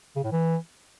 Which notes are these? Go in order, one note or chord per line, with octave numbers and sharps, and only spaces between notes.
C#3
A2
E3